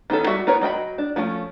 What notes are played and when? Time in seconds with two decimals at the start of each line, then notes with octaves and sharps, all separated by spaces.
0.10 D#3 B3 C#4 A4
0.26 G3 F#4 E5
0.47 B3 A#4 B4 C#5
0.61 F#3 D#5 G5 B5
0.98 D4
1.16 F3 A3 C4 C#4